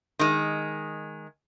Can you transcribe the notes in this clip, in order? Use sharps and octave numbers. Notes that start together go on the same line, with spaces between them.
D#3 G#3